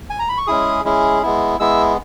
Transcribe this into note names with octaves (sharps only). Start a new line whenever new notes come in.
G#5
A#5
B5
C#6
G#3 C#4 E4 G#4 D#6
G#3 C#4 E4 G#4
G#3 B3 E4
G#3 B3 E4 E6